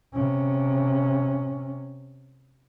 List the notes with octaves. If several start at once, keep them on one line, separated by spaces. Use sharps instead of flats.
C3 C#4